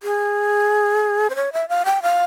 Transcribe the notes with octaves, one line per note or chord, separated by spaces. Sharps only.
G#4
C5
C#5
E5
F5
G5
F5